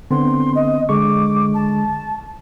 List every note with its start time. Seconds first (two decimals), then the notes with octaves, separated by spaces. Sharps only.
0.11 D3 B3 C4 C6
0.55 D#5
0.89 D3 G#3 C#6 D6
1.54 A5